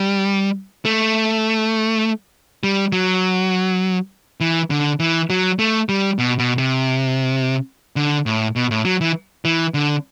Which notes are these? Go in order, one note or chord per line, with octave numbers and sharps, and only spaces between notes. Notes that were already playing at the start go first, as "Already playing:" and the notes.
Already playing: G3
A3
G3
F#3
E3
D3
E3
F#3
A3
G3
B2
B2
C3
D3
A2
B2
A2
F#3
E3
E3
D3